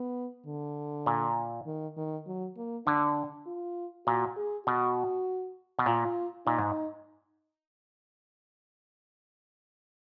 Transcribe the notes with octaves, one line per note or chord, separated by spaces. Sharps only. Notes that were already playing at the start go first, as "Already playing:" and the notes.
Already playing: B3
D3
A#2
D#3
D#3
F#3
A#3
D3 D4
F4
A#2 F#4
G#4
B2 F#4
B2
A#2 F4
A#2 D#4
G#2